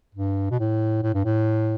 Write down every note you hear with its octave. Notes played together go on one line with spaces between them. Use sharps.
G2
B2
A2
A2
G2
A2